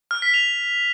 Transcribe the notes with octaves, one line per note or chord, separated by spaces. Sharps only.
F6
B6
F7